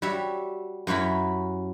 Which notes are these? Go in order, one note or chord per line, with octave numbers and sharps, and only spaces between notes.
G3 F#4 C#5 E5
F#2 F#3 C#4 E4 B5